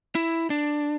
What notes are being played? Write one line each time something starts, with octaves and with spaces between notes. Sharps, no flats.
E4
D4